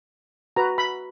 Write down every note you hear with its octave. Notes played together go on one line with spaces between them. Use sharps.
F#4 B4 A#5
B5